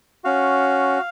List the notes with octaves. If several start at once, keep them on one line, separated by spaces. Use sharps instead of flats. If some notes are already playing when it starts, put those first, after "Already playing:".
C#4 F#4 F5